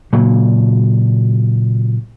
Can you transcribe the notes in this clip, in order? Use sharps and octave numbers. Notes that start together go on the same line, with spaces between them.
A#2 C#3 F#3